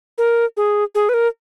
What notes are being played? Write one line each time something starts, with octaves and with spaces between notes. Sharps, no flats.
A#4
G#4
G#4
B4
A#4